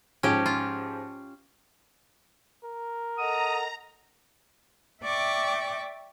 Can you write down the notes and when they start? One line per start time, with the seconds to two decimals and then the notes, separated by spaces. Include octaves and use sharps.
0.23 G#2 F3 C#4 G4
0.46 F4
2.64 A#4
3.18 A4 D#5 F#5 A#5 D#6
5.03 D5 E5 G5 C#6 D6